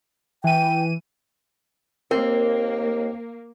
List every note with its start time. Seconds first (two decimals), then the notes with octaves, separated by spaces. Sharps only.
0.44 E3 G5 D#7
2.11 D#2 A#3 C4 A#4